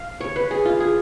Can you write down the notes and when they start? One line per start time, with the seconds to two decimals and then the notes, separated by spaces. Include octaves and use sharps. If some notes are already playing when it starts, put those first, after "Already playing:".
Already playing: F5
0.21 C#5
0.36 B4
0.51 G#4
0.65 F4
0.80 G#4